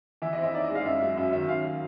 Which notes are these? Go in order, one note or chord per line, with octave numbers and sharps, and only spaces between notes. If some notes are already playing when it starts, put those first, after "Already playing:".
E3 E5
C4 D#5
E5
D#4 D5
D#5
G#3
F5
F#2 E5
F#3
F#2 E5
D#3 E5
F#2 F5
F#3